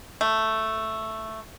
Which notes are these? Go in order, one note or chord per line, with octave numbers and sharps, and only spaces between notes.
A3